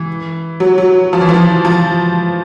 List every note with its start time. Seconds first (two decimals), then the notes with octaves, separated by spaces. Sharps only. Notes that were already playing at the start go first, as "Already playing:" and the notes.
Already playing: E3
0.60 F#3
0.78 F#3
1.13 F3
1.21 E3
1.29 F3
1.65 F3